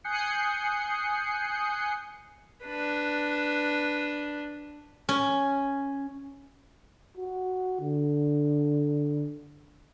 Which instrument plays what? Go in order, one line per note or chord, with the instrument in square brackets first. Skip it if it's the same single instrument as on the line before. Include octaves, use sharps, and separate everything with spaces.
[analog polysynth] G#5 D#6 F#6 G6 C7 C#7
[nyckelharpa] D4 B4
[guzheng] C#4
[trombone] F#4
D3